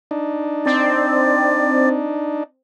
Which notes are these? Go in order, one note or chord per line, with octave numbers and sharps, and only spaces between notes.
D4 D#4
C4 D5